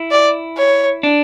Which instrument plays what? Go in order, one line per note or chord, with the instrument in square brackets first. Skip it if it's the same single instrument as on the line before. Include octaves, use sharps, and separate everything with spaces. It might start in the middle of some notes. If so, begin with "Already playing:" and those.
Already playing: [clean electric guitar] E4
[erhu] D5
C#5
[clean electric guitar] D4